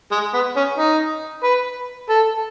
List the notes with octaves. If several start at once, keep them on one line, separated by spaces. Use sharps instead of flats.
G#3
B3
C#4
D#4
B4
A4